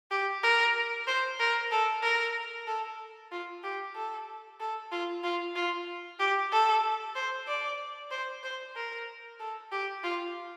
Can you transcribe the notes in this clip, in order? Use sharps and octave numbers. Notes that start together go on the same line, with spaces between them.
G4
A#4
C5
A#4
A4
A#4
A4
F4
G4
A4
A4
F4
F4
F4
G4
A4
C5
D5
C5
C5
A#4
A4
G4
F4